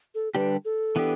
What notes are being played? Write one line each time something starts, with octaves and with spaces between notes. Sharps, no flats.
A4
D3 G3 D4 G4 B4
A4
E3 B3 D4 G4